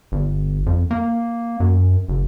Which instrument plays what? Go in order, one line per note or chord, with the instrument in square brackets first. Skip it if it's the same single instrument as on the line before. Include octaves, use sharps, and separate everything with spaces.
[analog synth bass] G1
F2
A#3
F#2
F#1